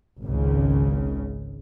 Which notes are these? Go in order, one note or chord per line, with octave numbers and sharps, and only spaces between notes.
G#1 C#2 C#3